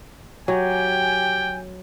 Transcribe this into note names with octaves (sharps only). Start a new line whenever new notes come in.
F#3 G4 G5 G#5